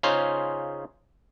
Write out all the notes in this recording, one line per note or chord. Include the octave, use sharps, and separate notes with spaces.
C#3 C#4 D#4 F4 G#4 C5